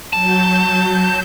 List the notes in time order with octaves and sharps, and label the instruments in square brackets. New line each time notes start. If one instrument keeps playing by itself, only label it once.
[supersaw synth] F#3 G6 [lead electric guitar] A5